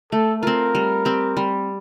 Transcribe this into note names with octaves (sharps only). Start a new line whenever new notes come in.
A3 A4
C4 F4 A#4
G3
C4 G4
G3